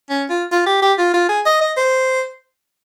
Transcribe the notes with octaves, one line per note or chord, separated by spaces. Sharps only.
C#4
F4
F4
G4
G4
F4
F4
G#4
D#5
D#5
C5